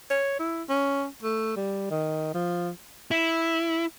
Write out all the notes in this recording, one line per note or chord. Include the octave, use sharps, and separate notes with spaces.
C#5
E4
C#4
A3
G3
D#3
F3
E4